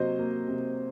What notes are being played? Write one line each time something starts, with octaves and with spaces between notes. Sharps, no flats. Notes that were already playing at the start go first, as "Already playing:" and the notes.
Already playing: C3 F#3 A#3 C5 D#5
A#3
C3